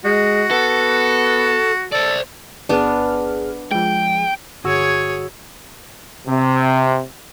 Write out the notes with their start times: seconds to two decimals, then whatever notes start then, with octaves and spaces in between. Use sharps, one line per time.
0.05 G#3 F#4
0.51 B3 A4
1.92 A4 C5 D5
2.69 G1 B3 D4 G#4 F6
3.71 F3 G#3 G5
4.64 G1 F#4 G#4 C#5 E6
6.27 C3